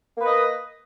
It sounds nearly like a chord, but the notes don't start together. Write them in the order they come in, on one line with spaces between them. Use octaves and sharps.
A#3 B4 D#5